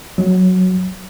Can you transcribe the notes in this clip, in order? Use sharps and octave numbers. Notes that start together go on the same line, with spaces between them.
F#3